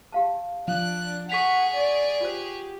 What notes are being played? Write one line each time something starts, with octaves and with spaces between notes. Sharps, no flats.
G4 F5 A5
F3 D4 F#6
G#4 F#5 C#6 B6 F7
D5
F4 G4 C5